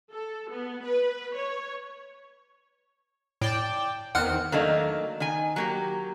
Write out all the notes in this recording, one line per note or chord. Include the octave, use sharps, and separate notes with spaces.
A4
B3
B4
C#5
A2 D5 G5 A5
E2 D#3 C4 F#5 F6 F#6
D#3 F#3 A3 A#3 D4 D#4
D#3 G#5
F#3 A#3 G4